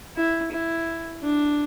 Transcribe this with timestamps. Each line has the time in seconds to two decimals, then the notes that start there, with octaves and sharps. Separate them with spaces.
0.16 E4
0.52 E4
1.23 D4